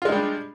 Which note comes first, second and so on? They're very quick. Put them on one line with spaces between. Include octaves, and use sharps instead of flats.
F4 G#3 D#4 G3 D4